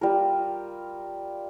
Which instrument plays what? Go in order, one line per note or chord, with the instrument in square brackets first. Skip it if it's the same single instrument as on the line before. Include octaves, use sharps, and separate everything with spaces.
[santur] G3 F4 A#4